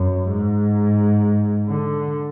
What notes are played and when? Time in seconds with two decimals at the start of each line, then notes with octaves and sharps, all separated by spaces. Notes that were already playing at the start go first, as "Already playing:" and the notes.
Already playing: F#2
0.30 G#2
1.69 D3